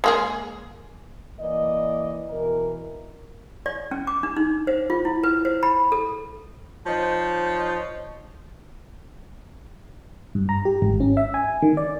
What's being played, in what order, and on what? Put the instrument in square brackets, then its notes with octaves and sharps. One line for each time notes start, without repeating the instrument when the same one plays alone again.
[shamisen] G#3 A#3 G#4
[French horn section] E3 A#3 D5 D#5
B2 E3 A#4
[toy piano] D5
C#4
D6
D4
D#4
C5
F4
E4
B4
C5
B5
A4
[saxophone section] F3 D#4 C5 C#5
[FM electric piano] G2
A#5
G4
G#1
C#4
E5
G#5
D#3
D5